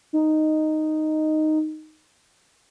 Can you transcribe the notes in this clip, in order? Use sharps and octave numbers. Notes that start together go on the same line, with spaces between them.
D#4